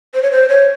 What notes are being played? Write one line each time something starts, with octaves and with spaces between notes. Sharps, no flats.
C5
C#5
C5
C#5